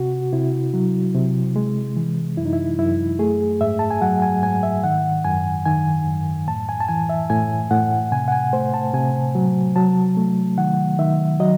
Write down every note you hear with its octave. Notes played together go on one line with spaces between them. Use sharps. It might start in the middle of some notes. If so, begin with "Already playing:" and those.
Already playing: C3 F#4
C3 E4
F#3
C3
G#3
E3
F#2 E4
D#4
E4
F#2 E4
A3 G#4
G#2 E5
A5
G#5
F#3 F#5
G#5
G#2 G#5
E5
D#3 F#5
F#2 G#5
D#3 G#5
F#2
A2 A5
G#5
A5
E3 G#5
E5
A2 G#5
A2 F#5
C3 G#5
F#5
G#5
A3 C5
A5
C3 G#5
F#3
F#3 A5
A3
D#3 F#5
D#3 E5
F#3 D#5